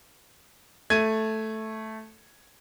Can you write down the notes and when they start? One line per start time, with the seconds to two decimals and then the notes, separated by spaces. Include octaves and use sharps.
0.90 A3 G#6 D#7